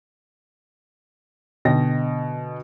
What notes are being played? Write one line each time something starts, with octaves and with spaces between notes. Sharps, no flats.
B2 D3 D#5 G5 A#6